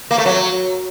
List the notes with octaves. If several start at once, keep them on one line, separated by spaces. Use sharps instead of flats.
A#3
A3
F#3